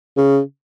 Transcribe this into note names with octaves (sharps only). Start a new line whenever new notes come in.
C#3